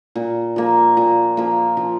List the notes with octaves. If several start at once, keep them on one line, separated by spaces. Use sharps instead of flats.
A#2
F3 A#3
A#2
F3 A#3
F3